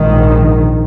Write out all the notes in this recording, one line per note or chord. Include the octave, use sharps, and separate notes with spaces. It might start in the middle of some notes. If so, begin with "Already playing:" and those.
Already playing: A#1 G#2 D#3